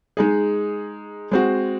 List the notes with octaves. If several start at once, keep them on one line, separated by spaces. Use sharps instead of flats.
G#3 D#4 G#4
G#3 C4 F#4